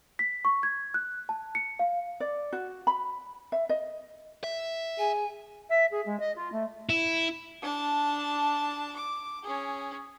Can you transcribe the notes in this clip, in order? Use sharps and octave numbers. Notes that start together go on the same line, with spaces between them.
B6
C#6
G#6
F#6
A5
C#7
F5
D5
F#4
B5
E5
D#5
E5
G#4 G#5
E5
G#4
G#3
D#5
F4
A3
E4
D4 A5
D6
C#4 G#4